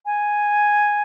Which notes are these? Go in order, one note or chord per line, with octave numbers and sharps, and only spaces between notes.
G#5